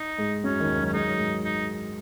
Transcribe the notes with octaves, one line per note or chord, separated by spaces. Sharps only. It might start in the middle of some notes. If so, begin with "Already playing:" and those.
Already playing: D#4
G#2 G#3
F#2 F#3 C#4
D#2 D#3
F#2 F#3
C#4
G#3 D#4
F#3
G#2 G#3
D#4